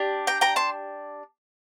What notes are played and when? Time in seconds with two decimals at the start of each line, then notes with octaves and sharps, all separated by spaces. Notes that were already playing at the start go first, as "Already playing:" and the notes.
Already playing: D4 G4
0.27 G5 A#5
0.41 G5 A#5
0.56 A5 C6